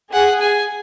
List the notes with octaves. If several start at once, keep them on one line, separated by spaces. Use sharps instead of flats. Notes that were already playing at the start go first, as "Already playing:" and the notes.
G#4 F#5
G#5